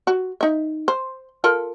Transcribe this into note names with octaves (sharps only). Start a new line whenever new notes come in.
F#4
D#4 E5
C5
F4 A4 A#4